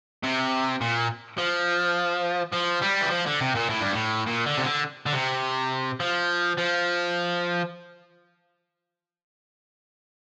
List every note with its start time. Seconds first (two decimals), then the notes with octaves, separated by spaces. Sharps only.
0.23 C3
0.81 A#2
1.38 F3
2.53 F3
2.82 G3
3.02 E3
3.10 F3
3.26 D3
3.41 C3
3.55 A#2
3.69 A2
3.81 G2
3.92 A2
4.26 A#2
4.46 D3
4.58 C3
4.65 D3
5.06 D3
5.13 C3
6.00 F3
6.58 F3